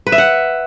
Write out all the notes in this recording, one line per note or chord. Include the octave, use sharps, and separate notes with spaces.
B4
E5
F#5